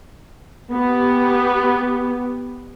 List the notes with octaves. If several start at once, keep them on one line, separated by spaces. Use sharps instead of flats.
B3 G4